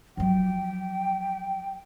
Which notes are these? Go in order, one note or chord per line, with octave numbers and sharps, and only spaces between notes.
F3 F#3 G5